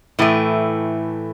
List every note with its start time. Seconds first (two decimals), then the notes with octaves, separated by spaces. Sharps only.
0.19 A2 E3 A3